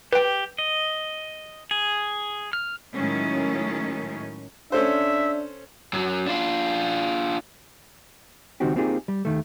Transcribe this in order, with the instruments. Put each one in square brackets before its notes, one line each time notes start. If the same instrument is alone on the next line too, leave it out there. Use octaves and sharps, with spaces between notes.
[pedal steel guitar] G4 [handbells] B4 G5
[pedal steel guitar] D#5
G#4
F6
[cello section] A2 D#3 F#3 G#3 C#4
[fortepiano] C#4 A4 C5 [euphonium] D4 [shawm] E5
[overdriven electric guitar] F#2 F#3
D4 F4
[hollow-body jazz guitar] C#2 D#3 C4 D#4 F#4 G4
A#3 C4 D#4 F4 G4 G#4
G3
D#2 D#3 A3